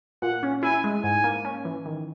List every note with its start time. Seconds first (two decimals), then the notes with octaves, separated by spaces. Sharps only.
0.22 A#2 F#5
0.43 C#4
0.63 E4 G#5
0.84 G#3
1.03 G#2 G#5
1.24 A#3
1.45 C#4
1.65 E3
1.86 D#3